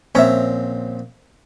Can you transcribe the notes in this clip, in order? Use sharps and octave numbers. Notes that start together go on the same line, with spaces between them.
A#1 C4 C#4 E5 A#5